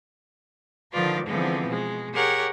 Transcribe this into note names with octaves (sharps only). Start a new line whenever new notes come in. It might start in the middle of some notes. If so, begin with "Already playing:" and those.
D3 D#3 F3 F4 B4 D5
D3 E3 F3 G#3 B3 C4
B2 G#3
G4 G#4 A#4 C#5 F#5